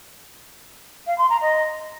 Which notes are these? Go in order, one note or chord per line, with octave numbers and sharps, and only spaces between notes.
F5
C6
A#5
D#5